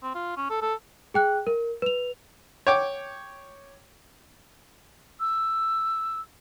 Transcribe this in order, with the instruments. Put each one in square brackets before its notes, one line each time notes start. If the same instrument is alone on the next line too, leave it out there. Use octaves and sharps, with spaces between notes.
[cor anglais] C4
F4
C#4
A4
A4
[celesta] G#4 G5 F#6
A#4
B4 F7
[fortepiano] C#5 G5 D6
[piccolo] E6